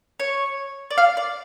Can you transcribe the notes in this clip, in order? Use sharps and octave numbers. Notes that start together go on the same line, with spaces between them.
C#5
D5
F5
D5